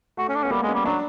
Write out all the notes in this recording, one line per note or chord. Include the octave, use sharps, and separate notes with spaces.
A3 F#4
C#4
D4
C#4
B3
G3 A#3
G#3
C#4
G3
F#3 D4